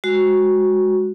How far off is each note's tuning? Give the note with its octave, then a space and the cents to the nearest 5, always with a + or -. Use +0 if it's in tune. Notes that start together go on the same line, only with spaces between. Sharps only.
G#3 -10 F#4 +0